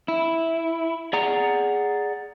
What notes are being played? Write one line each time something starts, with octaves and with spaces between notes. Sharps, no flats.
E4
G#4 D5 F#5 A#5